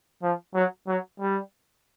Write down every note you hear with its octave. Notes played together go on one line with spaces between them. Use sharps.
F3
F#3
F#3
G3